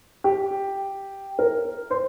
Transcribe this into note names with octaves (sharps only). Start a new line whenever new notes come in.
G4
A#4
C5